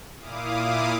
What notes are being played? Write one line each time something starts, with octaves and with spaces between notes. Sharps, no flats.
A#2 E4 F5 D6 D#6